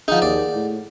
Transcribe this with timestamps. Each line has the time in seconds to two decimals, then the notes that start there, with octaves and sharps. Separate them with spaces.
0.08 F3 D#4 G#4 F#5
0.22 D#2 D5
0.55 A2